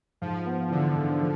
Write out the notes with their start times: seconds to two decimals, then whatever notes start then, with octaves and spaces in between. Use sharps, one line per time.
0.22 G#2 F3
0.46 B3
0.70 D3 E3
0.95 G#2
1.20 F3